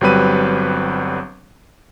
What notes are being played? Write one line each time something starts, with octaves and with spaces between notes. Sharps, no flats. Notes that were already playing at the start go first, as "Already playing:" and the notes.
G1 F#3 G3 C4 B4 D#7